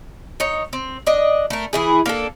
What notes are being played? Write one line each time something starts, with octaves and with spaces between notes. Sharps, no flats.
D#4 C#5
C4
D4 D#5
A3 A#4
E3 E4 G#4
A#3 D4 A4